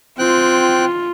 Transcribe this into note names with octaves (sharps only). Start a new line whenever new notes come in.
C4 F4 G5 F#6